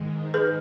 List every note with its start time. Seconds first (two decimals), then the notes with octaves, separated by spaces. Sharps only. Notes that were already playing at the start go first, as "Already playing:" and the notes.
Already playing: G#2 D#3 G#3
0.34 G#4 B4